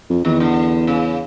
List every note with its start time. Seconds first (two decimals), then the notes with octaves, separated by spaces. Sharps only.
0.10 F2
0.25 E2 D#3
0.40 D3
0.87 C#3